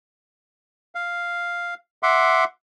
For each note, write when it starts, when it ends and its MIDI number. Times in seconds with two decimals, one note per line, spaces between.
0.95 1.74 77
2.03 2.44 76
2.03 2.44 78
2.03 2.44 84
2.03 2.44 86